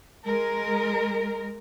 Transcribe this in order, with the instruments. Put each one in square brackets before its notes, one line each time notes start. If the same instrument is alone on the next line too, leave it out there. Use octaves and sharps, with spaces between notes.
[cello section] G#3 A#4